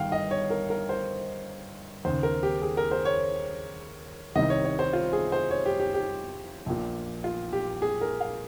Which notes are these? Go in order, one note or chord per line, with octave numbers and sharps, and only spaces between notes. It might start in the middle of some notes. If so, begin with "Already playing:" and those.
Already playing: G1 G2 D#3 F5 G5
D#5
C#5
A#4
A#4
C5
D#2 C#3 C5
A#4
G4
G#4
A#4
C5
C#5
C2 C3 D#3 D#5
C#5
C#5
C5
F4
G#4
C5
C#5
G4
G4
G4
A#1 A#2
F4
G4
G#4
A#4
F5